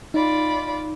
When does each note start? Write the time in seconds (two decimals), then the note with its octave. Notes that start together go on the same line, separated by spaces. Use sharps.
0.14 D#4 F4 D5 B5